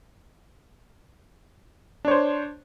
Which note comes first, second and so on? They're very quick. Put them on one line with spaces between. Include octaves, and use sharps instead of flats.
D4 C#5 C5